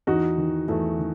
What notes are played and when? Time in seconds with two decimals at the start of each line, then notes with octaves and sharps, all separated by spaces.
0.07 E2 D#4 F#4
0.38 D#3
0.68 E2 A3
0.99 D#3